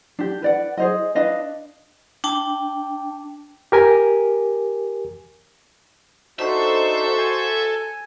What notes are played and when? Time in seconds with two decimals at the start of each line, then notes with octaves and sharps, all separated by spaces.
0.19 D4 G4
0.42 B4 D5 F#5
0.77 G#4 C5 D#5
1.15 D4 B4 D#5 F5
2.24 D4 G5 A5
3.72 G4 A#4 G#5
6.39 D4 D#4 F#4 A4 C5 E5
7.18 G#5